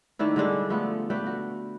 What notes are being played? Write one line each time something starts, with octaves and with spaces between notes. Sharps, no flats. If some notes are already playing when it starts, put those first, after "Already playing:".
D#3 A3 D4 E4
D3 G3 G#3 D4
F3 A3 B3
A3 B4 D5 G5
F#4